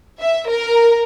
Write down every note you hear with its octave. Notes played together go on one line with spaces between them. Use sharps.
E5
A#4